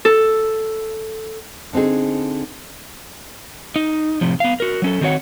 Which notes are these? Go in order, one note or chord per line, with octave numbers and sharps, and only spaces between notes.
A4
D3 C4 D#4 G#4
D#4
A2 C3 F3
B3 F5
F#4 A#4
F#3 C#4 A4
D#3 C4 F#4 C#5 F#5